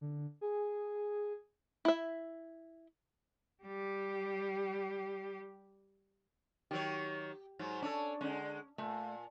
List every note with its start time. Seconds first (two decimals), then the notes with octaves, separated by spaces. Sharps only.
0.01 D3
0.41 G#4
1.85 E4 E5
3.63 G3 G4
6.71 D#3 F#3 G4 C#5
7.59 G#2 F#3
7.82 C#4 D4 A4 C#5
8.21 D3 G#3 C#4
8.78 A#2 A3